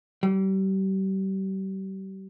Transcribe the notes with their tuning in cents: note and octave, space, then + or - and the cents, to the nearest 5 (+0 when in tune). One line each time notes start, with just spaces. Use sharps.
G3 -35